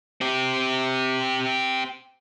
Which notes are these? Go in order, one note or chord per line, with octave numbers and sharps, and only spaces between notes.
C4 G4